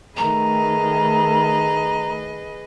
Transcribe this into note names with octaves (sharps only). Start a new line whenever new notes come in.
D#3 A3 G#4 B4 D#5 A#5